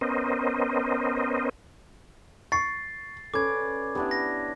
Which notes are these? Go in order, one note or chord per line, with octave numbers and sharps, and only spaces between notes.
B3 C#4 A#4 C5 D#5
C#6 A6 C7
C#4 A4 B4 D5 D6 G#6
B3 D4 E4 G4
A#6